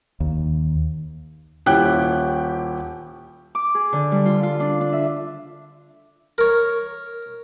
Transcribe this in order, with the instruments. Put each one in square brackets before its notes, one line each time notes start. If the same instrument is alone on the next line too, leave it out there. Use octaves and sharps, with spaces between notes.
[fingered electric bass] D#2
[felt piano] D#1 C#4 E4 G4 G5 F#6
[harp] D6
G#4
D3
G3
F4
F4
D4
D4
E5
[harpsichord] A#4 C#5